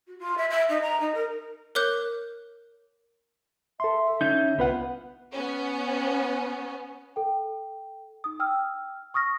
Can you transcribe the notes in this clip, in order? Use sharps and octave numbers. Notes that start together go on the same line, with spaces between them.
F#4
F4
E5
E5
D#4
A#5
D#4
A#4
A#4 C#5 D6 F#6 G6
A4 E5 C6
D3 C#4 D#4 G6
C2 B3 F4 B4 F#5
B3 C#4
A4 G5
D#4 D#6
G5 E6 F6
C#6 D#6 F6 A#6